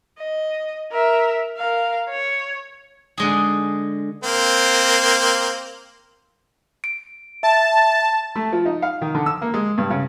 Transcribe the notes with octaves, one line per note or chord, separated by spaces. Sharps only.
D#5
A#4 E5
A#4 F5
C#5
D3 G#3 G#4
A#3 C4
D7
E5 A5
A3
F3
D#4
F5
D#3
D3
E6
A#3
G#3
G2
C#3